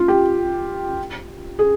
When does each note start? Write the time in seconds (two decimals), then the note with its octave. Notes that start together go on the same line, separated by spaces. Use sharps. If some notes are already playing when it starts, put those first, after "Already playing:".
Already playing: F4
0.08 G4
1.59 G#4